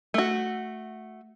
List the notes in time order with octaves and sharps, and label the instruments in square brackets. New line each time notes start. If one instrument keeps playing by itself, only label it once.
[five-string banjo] A3 F#4